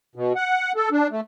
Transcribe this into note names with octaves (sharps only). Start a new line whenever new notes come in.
B2
F#5
A4
D4
A3